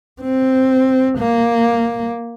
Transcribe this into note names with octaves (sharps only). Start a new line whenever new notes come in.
C4
A#3